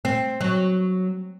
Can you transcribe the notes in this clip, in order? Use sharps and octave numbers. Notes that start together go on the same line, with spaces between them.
C4
F#3